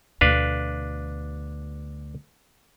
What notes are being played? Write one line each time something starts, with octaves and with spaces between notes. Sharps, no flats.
D2 B2 D4 B4 F5